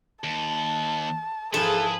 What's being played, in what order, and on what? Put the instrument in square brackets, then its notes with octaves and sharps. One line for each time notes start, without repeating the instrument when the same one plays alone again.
[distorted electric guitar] D#2 [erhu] A5
[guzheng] G#2 F3 A#3 [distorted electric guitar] E4 B4 [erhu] G#4 [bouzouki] A4